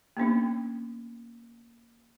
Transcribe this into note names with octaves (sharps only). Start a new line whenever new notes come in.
A#3 B3 C#4 D4